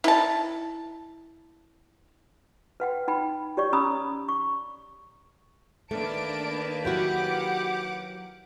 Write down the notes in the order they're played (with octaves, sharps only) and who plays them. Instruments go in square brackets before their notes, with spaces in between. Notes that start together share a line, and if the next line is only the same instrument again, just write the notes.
[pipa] E4 A5
[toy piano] B4 F#5 G5
D#4 G5 B5
G4 C#5 D5 C#6
C#4 A#5 B5 D#6 E6
C#6
[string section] D#3 A#3 B4 [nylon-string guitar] A3 [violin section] D4 A5 D7
[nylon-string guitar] F#3 E4 F#4 [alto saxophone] G4 [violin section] F#5 D6